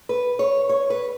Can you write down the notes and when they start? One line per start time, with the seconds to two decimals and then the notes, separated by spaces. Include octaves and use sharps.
0.09 B4
0.39 C#5
0.69 C#5
0.90 B4